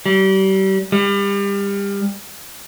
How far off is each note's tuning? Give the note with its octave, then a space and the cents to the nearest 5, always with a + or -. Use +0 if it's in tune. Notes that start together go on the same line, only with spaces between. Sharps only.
G3 -35
G3 +30